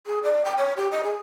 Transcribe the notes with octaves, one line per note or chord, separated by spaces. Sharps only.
G#4
D5
G5
C#5
G4
D#5
G#4